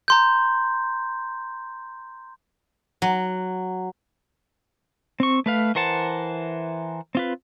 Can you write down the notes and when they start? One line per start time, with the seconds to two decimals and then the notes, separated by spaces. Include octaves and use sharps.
0.08 A#5 C6 G6
3.02 F#3
5.20 C4 C#6
5.46 A3 B4 F5
5.75 E3 A#4 C5 F#5 A5
7.15 C4 F4 B4